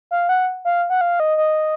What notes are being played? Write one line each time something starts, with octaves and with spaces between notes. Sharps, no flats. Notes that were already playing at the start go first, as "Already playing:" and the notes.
F5
F#5
F5
F#5
F5
D#5
D#5